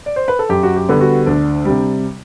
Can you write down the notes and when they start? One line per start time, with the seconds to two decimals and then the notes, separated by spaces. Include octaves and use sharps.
0.06 D5
0.16 C5
0.28 B4
0.39 A4
0.49 F#2 G4
0.63 F#4
0.76 G4
0.89 D3 G3 B3
1.01 F#4
1.26 D2 D4
1.65 C3 G3